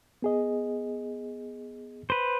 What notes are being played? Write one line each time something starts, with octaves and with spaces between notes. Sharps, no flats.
B3 G#4 D#5
B4 C5